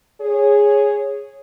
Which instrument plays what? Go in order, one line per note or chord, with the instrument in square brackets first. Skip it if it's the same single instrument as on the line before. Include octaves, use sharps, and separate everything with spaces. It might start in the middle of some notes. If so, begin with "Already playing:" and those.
[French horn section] G#4 C#5